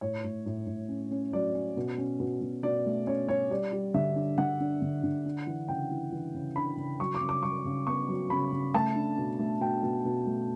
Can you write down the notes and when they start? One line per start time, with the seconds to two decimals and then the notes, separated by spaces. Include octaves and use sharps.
0.01 A2 C#5
0.24 A2
0.46 A2
0.67 A2
0.88 C#4
1.11 C#4
1.33 F#3 D5
1.54 C#4
1.77 B2
1.98 C#4
2.20 B2
2.41 B2
2.63 B2 D5
2.86 A3
3.07 C#4 C#5
3.29 C#4 C#5
3.51 G3 D5
3.73 G3
3.94 D3 E5
4.16 D4
4.38 D3 F#5
4.60 D4
4.82 D3
5.04 D3
5.26 D4
5.47 E3
5.68 C#3 G5
5.91 E3
6.12 E3
6.34 C#3
6.56 D4 B5
6.77 C#3
7.00 F#3 C#6
7.15 D6
7.21 C#3
7.29 D6
7.43 F#3 C#6
7.65 C#3
7.87 B3 C#6
8.08 F#3
8.30 C#3 B5
8.52 C#3
8.74 A3 A5
8.95 D4
9.18 B2
9.39 A3
9.61 B2 G5
9.83 B2
10.05 B2
10.26 A3